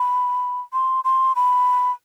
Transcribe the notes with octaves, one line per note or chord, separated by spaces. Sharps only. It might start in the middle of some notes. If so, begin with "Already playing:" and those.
Already playing: B5
C6
C6
B5